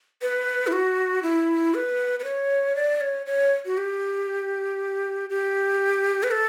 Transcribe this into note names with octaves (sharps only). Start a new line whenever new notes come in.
B4
E4
F#4
E4
B4
B4
C#5
D5
C#5
C#5
F#4
G4
G4
B4
A4